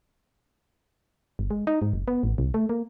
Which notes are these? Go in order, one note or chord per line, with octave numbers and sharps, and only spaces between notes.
G1
G#3
D#4
G#2
F#1
B3
A1
C2
A3
A#3